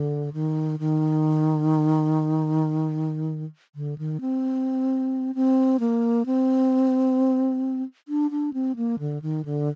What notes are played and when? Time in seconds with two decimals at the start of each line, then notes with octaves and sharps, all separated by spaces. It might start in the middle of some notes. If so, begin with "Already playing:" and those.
Already playing: D3
0.33 D#3
0.79 D#3
3.75 D3
3.98 D#3
4.21 C4
5.35 C4
5.80 A#3
6.26 C4
8.08 D4
8.31 D4
8.53 C4
8.76 A#3
8.99 D3
9.22 D#3
9.45 D3